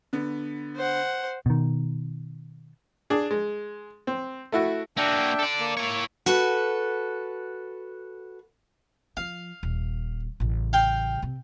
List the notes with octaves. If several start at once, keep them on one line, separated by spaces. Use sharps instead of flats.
D3 B3
C5 F#5
B2 D#3
D4 G#4
G#3
C4
A3 E4 F#4
A#3 D4 F#4 E5 G5
A4 D5
A#3
E4 C#5
F#4 A4 B4
F3 F5
D#1
A1 C#3
F5 G5
C3 C4